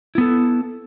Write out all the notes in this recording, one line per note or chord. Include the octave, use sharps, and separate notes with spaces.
B3 E4 A4